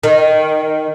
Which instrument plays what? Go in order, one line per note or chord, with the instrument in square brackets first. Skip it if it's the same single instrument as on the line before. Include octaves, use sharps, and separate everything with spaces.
[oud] D#3